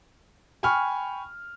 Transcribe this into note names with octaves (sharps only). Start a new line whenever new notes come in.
G5 G#5 B5 C#6 F6